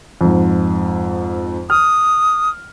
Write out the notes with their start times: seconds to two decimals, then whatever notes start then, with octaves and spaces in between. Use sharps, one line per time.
0.21 F2 G#2
1.70 D#6 F6